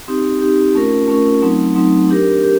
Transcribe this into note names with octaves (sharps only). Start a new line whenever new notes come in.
C4 D#4 G4
C4 D#4 G4
A3 C#4 F4 A#4
A3 C#4 F4 A#4
F#3 A3 C4 D#4
F#3 A3 C4 D#4
D4 G4 A#4
G4 A#4